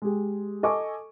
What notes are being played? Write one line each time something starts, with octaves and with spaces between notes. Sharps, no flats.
G#3 G4 G#4
A4 D#5 G#5 C#6 D6